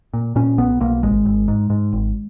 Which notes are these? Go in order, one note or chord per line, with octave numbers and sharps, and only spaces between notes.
A#2
A#2 C#4
B1 B3
B1 A#3
G#1 G#3
G#1
G#2
G#2
G#1